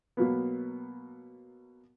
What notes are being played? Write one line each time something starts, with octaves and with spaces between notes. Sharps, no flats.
B2 F#3 A#3 B3